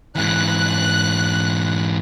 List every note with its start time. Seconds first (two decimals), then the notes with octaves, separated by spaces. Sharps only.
0.16 G#2 E3 F#6